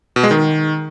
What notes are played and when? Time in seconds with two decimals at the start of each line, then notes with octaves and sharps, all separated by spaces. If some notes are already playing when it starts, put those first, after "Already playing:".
0.16 B2
0.23 G#3
0.31 D#3